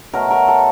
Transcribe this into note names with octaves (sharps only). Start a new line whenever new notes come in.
B2 F#3 A3 A#4
A#4
A4